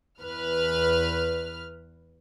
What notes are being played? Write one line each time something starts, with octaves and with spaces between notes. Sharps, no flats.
E2 B4 F6